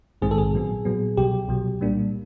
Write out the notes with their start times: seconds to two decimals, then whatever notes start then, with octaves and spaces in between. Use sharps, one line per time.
0.22 A#1 G#2 D#3 G#3 C4 G#4
0.31 A4
0.38 G#4
0.53 A#2 F#3 B3
0.85 A#2 F#3 B3
1.17 C2 B2 F#3 G4
1.48 C2 B2 F#3
1.80 A#2 G3 A#3 D4